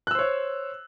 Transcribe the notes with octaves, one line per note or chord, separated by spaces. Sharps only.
C5 C#5 E6 F#6